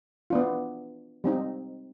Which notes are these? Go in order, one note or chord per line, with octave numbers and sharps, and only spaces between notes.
B3 D4 F4
G3 C4 D#4